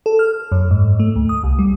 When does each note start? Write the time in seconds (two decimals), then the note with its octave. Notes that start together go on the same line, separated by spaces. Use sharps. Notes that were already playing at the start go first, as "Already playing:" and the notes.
0.06 A4
0.19 F6
0.52 F#2
0.71 G#2
1.00 A3
1.16 D2
1.29 D#6
1.43 C2
1.59 G3